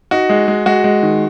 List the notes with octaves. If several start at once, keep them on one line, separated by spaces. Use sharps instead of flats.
D#4 F#4
G#3
G#3
G#3 F#4
G#3
D#3